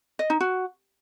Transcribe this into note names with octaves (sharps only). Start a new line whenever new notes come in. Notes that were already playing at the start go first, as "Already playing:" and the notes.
D#5
D#4
F#4